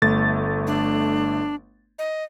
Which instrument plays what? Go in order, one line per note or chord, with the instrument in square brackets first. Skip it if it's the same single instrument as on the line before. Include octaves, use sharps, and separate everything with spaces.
[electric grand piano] G1 A3 A6
[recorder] D4
D#5